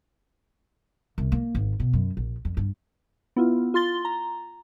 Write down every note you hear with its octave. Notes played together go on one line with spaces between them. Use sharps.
C2
A#3
G#1
B2
F#2
A#1
F2
G2
B3 E4 F4
F4 C6 A6 G7
A#5